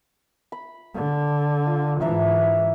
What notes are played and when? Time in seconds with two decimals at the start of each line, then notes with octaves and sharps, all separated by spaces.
0.52 B5
0.95 D3
1.66 F4
2.01 G#2 E3 D4 E5 A#5